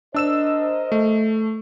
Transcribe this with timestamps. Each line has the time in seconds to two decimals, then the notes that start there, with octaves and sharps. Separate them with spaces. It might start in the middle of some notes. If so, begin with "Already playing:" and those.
0.14 D4 A#4 C5 D#5 E6 E7
0.92 A3